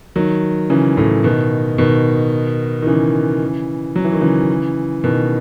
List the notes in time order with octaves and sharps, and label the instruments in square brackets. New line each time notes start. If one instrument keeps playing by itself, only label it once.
[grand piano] D#3 F#3
C#3 E3
A2 C#3
B2 D#3
B2 D#3
D#3
C#3 E3
F#3
E3
D#3
C#3 E3
B2 D#3